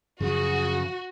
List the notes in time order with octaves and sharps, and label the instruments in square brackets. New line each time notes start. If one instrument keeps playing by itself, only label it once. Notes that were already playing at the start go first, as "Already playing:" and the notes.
[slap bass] F#2 F3 [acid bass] C#3 [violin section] F#4 [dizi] G#4